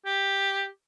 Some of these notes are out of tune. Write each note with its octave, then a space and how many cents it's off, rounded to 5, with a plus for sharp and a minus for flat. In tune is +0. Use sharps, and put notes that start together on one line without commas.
G4 +5